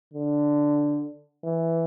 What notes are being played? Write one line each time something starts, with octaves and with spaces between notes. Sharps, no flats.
D3
E3